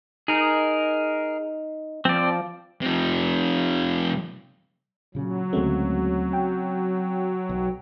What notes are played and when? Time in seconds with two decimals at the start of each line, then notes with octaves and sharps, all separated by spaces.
0.28 D#4 G#4 A#4
2.05 F3 C4 D5
2.82 C3 F3
5.15 A#2 C#3 F#3
5.53 D2 C#3 G#3 A3 C4 C#4
6.33 G5
7.49 B1